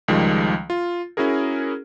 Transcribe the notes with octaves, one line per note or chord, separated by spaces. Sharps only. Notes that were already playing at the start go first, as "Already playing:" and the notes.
C#2 D#3 F3 G3 G#3
F4
C#4 E4 F#4 G#4 A#4